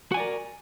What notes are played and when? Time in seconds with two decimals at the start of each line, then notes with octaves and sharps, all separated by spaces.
0.12 F#4
0.14 G#5
0.17 D5
0.20 A#4